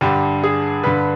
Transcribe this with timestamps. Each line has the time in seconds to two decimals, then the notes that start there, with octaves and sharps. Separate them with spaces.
0.01 G2 D3 G4
0.43 G#4
0.83 G2 D3 B4